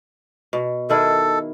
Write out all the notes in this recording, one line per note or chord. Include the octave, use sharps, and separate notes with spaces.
B2
D#3 E4 G#4 A4